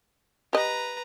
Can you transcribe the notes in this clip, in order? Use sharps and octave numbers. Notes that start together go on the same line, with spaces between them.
G4 B4 D#5 A#5